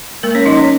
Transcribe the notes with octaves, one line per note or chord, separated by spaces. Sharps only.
G#3 A#3 A#4
C#4 C#5
F3 D#4 D#5
C#4 C#5